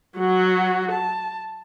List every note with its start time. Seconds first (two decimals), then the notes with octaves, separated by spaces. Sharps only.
0.17 F#3 F#4
0.91 A5